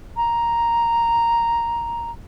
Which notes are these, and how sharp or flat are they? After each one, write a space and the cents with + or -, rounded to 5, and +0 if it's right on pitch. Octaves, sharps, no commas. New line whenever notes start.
A#5 +0